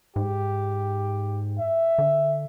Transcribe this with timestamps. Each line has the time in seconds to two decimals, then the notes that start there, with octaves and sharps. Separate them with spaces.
0.16 G#2 G4
1.59 E5
1.98 D3